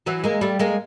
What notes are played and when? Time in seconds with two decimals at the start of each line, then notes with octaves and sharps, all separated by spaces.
0.06 E3 F#3
0.24 G#3 A#3
0.41 G3 A3
0.59 G#3 A#3